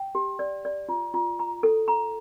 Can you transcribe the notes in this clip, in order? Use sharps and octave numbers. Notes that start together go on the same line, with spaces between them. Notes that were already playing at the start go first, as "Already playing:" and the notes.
Already playing: G5
G4
D5
D5
F4
F4
A#5
A4
A#5